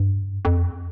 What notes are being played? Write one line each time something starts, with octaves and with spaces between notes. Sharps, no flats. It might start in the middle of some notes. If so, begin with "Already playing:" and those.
Already playing: G2
F2